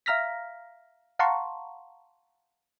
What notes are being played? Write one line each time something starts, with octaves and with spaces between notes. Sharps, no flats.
E5 F5 A#5 F6 A#6 B6
F5 F#5 A5 A#5 C6 C#6